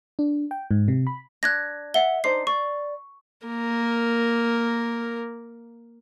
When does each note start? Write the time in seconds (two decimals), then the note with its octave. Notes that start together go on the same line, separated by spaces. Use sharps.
0.19 D4
0.51 G5
0.71 G#2
0.88 C3
1.07 B5
1.43 D4 F#6 G#6 A#6
1.94 E5 F#5 G7
2.24 D4 D#4 C5 C7
2.47 D5 C#6
3.47 A#3 A#4